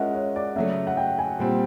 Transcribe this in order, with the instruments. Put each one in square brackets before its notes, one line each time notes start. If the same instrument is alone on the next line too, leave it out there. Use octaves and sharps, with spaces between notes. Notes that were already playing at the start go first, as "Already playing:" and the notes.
Already playing: [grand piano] G#3 C#4 F4 A#4 D#5 [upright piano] E5 F#5
[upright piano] C#5
D5
[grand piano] C#3 F#3 A3 [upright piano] E5
[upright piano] F#5
G5
G#5
[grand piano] A#2 G3 C4